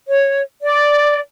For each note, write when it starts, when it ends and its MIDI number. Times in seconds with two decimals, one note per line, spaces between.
0.08 0.41 73
0.62 1.20 74